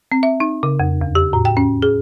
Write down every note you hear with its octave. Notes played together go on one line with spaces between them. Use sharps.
C4
E5
D#4
C#3
F2
E2
G4
A2
G5
C#4
G#4